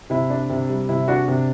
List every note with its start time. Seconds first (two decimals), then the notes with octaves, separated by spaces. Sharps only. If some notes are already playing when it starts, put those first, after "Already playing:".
0.10 C3 E4
0.30 D4
0.49 C3
0.69 G3
0.89 C3 E4
1.08 D4 F#4
1.28 C3